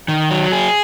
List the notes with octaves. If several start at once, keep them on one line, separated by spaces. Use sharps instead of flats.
D#3
F#3
G#4